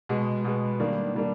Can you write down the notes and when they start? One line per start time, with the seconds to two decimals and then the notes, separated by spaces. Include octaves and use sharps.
0.09 B2 G#3 B3
0.44 B2 G#3 B3
0.79 D#3 G3 A#3 D4
1.15 D#3 G3 A#3 D4